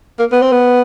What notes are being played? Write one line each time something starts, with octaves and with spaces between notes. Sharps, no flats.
A#3
B3
C4
B3